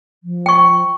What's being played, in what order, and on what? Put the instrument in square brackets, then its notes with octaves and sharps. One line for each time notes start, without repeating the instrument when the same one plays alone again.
[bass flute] F3
[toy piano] G5 C#6